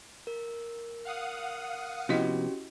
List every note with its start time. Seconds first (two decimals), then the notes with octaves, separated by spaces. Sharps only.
0.27 A#4
1.05 F5 F#5 D#6
2.09 C3 F3 B3 C#4 E4 F#4 G4 D#5